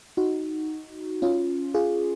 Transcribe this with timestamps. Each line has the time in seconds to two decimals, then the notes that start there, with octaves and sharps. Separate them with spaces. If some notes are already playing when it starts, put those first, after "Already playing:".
0.17 D#4 F#4
1.22 C#4 F4
1.74 F4 G#4